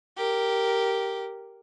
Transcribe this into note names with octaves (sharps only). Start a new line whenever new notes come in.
G4 A#4